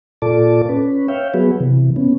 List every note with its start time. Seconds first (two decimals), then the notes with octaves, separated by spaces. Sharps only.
0.22 A#2 F4 A4 D5 A5 D6
0.69 C#4 B4
1.08 C#5 E5 F5 G5
1.34 F#3 B3 F#4 G#4 B4
1.60 C3 E3
1.96 B3 C#4